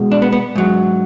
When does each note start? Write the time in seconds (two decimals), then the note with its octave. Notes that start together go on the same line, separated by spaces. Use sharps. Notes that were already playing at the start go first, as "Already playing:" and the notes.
Already playing: B2 G#3
0.11 D4
0.22 B3
0.32 B3
0.55 G#2 F#3